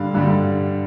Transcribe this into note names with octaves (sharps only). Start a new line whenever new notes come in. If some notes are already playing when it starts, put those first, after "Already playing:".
Already playing: G2 D3 G3 F5
G2 D3 G3